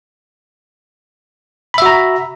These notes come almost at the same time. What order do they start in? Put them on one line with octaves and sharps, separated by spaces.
B5 E5 F#4 A#5